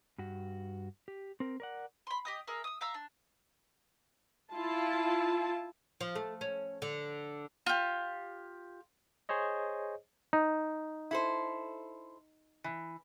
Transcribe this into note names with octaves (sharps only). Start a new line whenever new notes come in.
G2 F#4
G4
C4 A#4
A#4 D5 F#5
B5 C6
G4 D#5 D#6
G#4 A#4 E5
D#6 E6
E5 F5 A#5 E6
D4
E4 F4 A5
F3
A3
C#4
D3
F4 G4
G#4 C5 C#5 D#5
D#4
E4 A4 C5
E3